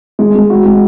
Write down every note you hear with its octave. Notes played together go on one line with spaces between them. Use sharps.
G#3
G#3
F#4
G#3